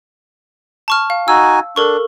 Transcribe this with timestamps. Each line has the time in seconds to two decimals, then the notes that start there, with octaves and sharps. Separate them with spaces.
0.88 A5 C#6 F6
1.10 F5
1.28 D#4 F#4 G#5 E6
1.76 D4 A4 A#4 C#6